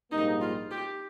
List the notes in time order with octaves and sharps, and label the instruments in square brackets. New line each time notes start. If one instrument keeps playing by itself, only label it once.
[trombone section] A#1 G#2 G3 A#3 [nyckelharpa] D#4
[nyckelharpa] F4
G4